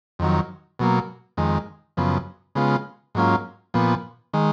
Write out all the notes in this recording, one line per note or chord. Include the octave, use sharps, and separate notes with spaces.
F2 D#3 F#3
B2 F#3 A#3
F2 D#3 G#3
F#2 C#3 F3 B3
C#3 G#3 B3 F4
G#2 F#3 A#3 C#4 F4
A#2 F3 B3
D#3 G#3